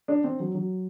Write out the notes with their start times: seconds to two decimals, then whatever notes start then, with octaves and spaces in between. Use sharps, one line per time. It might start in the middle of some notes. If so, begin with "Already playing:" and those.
0.08 D4
0.24 C4
0.40 F#3
0.55 F#3